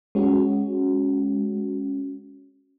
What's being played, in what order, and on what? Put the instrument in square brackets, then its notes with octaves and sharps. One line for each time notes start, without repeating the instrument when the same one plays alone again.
[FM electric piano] G#3 C#4 F#4